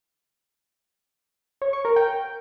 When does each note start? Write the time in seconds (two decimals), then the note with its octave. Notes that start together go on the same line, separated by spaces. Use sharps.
1.62 C#5
1.73 C#6
1.85 A#4
1.96 G5